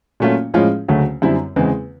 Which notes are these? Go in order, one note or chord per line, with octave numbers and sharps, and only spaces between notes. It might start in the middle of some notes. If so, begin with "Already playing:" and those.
A#2 F#3 A3 C#4 F4
A2 F3 G#3 C#4 F4
D2 C#3 F#3 A3 C#4
F#2 D3 G3 C4 E4
E2 C#3 E3 G#3 C4